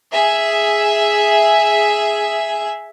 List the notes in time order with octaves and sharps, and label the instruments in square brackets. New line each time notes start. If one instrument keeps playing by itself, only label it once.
[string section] G#4 E5